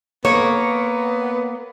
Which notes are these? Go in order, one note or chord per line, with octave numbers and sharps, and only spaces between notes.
A#3 B3 C#5